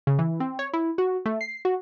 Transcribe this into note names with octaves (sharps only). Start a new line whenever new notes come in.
C#3
E3
C4
C#5
E4
F#4
A3
C7
F#4